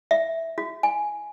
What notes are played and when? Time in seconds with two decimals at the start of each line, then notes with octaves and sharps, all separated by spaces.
0.11 E5
0.58 F#4
0.83 G#5